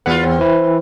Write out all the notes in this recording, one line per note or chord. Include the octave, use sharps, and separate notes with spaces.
E2 F4 B4 F#5
C4
E3 E4